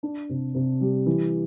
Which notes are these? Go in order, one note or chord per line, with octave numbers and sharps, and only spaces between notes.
D4
C3
C3
G3
E3